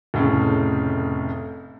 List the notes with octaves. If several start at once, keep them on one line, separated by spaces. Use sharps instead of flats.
F1 A2 C#3